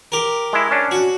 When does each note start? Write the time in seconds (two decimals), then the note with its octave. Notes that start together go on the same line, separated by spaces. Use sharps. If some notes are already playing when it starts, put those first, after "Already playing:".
0.12 G4 A#4
0.53 G#3 E4
0.71 C#4 D4
0.91 F#4